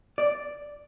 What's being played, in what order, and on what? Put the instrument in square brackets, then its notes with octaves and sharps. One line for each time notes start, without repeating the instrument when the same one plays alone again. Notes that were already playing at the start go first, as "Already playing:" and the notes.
[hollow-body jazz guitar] D5